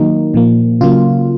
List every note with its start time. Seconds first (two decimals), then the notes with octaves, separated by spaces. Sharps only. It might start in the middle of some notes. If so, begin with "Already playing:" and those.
Already playing: D#3 F#3 A#3 D#4
0.34 A#2 F3 A#3
0.81 C#3 F#3 A#3 F4